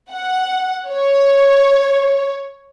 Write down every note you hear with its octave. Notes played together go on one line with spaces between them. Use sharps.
F#5
C#5